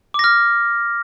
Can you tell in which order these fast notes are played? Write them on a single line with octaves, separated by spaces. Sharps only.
D6 A#6 F6